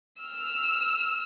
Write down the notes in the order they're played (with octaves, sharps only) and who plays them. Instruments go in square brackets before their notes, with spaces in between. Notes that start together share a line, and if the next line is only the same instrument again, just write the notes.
[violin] E6 F6